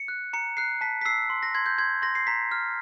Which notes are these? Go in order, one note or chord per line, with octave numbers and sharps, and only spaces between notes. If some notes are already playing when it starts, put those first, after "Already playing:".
Already playing: C#7
F#6
A#5 C#7
F#6 C7
A5 B6
B6
E6 C7
C6
A#6
C6 G#6
G6
C6 G#6
C6 A#6
C7
A#5 B6
F6